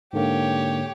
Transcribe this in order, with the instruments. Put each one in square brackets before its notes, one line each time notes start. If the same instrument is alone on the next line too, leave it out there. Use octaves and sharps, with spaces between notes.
[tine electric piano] G#2 D3 A#3 [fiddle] G4 C#5